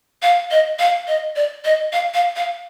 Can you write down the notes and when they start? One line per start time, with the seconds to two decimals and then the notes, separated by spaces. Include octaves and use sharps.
0.22 F5
0.51 D#5
0.79 F5
1.08 D#5
1.36 D5
1.65 D#5
1.93 F5
2.14 F5
2.36 F5